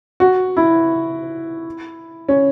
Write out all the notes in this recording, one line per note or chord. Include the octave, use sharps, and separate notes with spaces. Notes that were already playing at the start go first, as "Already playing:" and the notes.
F#4
E4
C#4